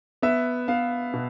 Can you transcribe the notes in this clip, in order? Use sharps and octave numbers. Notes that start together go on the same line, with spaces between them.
B3 E5
B3 F5
B2